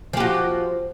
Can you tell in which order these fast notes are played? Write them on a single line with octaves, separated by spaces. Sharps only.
F3 G4 F#4